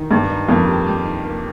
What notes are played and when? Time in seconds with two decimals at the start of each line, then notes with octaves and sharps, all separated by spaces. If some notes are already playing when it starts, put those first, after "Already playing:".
Already playing: D#3
0.11 G2 G3
0.30 D#4
0.48 F2 A#3
0.68 G4
0.87 G3
1.05 D#4
1.24 A#3